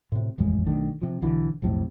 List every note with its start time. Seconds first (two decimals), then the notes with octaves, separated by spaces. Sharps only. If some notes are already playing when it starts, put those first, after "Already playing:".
0.12 A2 C3
0.38 D#1 A1 F2 G#3
0.67 B1 D#3 A3 D4
1.01 C3 F3
1.22 B1 D3 E3
1.62 B1 F2 A2 C3